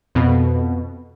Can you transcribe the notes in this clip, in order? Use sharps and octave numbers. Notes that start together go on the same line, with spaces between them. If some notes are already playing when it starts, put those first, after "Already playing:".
F2 B2